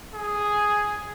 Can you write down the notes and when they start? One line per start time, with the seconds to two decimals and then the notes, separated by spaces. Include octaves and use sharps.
0.14 G#4